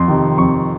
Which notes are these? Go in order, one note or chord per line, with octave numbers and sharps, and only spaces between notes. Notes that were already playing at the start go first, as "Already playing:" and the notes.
Already playing: F2 C6
C3 D#3
F2 C#6